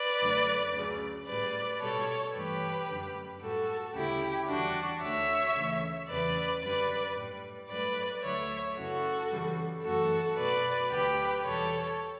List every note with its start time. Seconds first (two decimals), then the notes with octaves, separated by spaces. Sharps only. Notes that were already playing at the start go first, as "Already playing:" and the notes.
Already playing: B4 D5
0.21 F#2 D3 F#3 A3
0.75 D2 C#3 F#3
1.28 A2 G3 B4 D5
1.81 B2 G3 A4 C#5
2.35 G2 E3 A3 G4 B4
2.88 F#2 D3 G3
3.42 A2 G3 F#4 A4
3.95 D2 C#3 G3 E4 G4
4.49 E2 D3 G3 D4 F#4
5.02 D2 D3 A3 C#5 E5
5.56 D2 C#3 E3 A3
6.10 E2 C#3 G3 B4 D5
6.63 F#2 D3 G3 B4 D5
7.17 A2 G3
7.70 G2 F#3 A3 B4 D5
8.24 D2 D3 F#3 A3 C#5 E5
8.77 F#2 C#3 E3 F#4 A4
9.31 F#2 C#3 E3 G3
9.84 F#2 E3 A3 F#4 A4
10.38 B2 A3 B4 D5
10.91 D2 D3 F#3 G4 B4
11.44 E2 B2 G3 A4 C#5